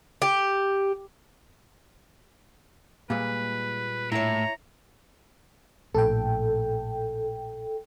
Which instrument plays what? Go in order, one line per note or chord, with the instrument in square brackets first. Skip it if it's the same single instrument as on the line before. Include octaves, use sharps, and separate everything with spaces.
[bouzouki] G4
[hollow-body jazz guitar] A#2 G3 G#3 [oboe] B4
[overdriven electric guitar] A2 [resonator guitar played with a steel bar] E4 C#5 [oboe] A#5
[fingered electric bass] A#1 A2 [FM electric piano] A4 G5